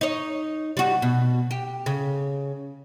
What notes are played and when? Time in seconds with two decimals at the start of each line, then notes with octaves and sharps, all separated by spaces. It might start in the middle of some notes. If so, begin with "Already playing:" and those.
0.01 D#4 C#5
0.77 G3 F#4
1.02 B2
1.51 G4
1.86 C#3